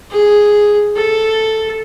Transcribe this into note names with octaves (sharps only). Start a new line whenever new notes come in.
G#4
A4